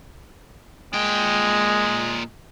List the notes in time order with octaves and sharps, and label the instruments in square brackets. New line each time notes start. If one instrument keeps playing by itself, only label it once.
[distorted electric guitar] A#2 G5 [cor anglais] G#3